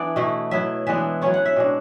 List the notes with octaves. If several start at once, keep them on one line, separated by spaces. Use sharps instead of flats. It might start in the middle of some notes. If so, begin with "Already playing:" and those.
Already playing: E3 B3 D4 D5
B2 A3 E4
F#3 B3 E4 E5
E3 G#3 B3 D4 E5
F#3 C#4 E4 C#5
F#5
E5
B2 G#3 D4